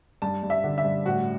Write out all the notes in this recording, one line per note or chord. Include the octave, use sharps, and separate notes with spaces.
G2 A5
G2
E5
D3
E5
G2
A2 F#4